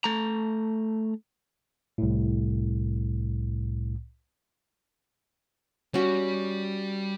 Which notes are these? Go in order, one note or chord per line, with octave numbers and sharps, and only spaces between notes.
A3 A#5
C2 A2
G3 C#4 F#4